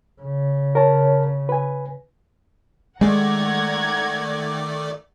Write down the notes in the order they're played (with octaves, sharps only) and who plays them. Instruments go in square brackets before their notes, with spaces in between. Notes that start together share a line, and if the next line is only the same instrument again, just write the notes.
[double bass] C#3
[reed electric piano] A#4 C#5 A5
B4 G#5
[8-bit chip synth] D#3 A3 D5 [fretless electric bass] G#3 [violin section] F#5 A#5 G#6